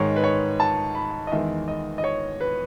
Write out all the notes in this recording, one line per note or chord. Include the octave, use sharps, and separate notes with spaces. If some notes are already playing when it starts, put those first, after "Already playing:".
Already playing: G#2 D#3 G#3 C#5
B4
C#5
A5
B5
D#5
E2 D#3 G#3 E5
D#5
D#5
C#5
B4